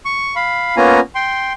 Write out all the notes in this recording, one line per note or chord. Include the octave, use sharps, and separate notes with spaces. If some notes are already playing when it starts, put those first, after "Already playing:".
C#6
F5 B5
A#3 B3 C#4 F4 G#5 A#5
G5 C6